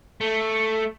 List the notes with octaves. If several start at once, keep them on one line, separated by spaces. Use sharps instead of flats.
A3